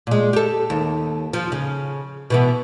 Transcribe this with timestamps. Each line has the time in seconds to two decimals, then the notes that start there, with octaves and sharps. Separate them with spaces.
0.07 A#2 G#3
0.33 G4 A4
0.70 D#2
1.33 F3
1.52 C#3
2.30 B2 E3 B3